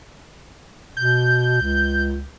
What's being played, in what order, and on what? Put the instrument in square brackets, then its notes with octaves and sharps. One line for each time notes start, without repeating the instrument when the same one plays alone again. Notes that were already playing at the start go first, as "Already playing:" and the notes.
[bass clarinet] B2 [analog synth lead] G6
[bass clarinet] C#2